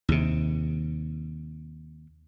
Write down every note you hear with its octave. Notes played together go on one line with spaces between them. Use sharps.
D#2 C3